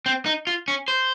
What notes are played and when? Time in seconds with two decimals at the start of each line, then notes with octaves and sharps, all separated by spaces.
0.06 C4
0.26 D#4
0.47 F4
0.68 C#4
0.88 C5